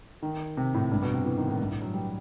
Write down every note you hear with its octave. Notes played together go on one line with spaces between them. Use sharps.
D#3
C3
A2
G2
B2
C3
E3
D#3
A2
G2
A2
F#3
G3